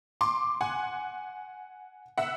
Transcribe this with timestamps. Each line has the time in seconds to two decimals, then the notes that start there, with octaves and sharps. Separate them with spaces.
0.21 C6 D6
0.61 F#5 G#5
2.18 E5 F#5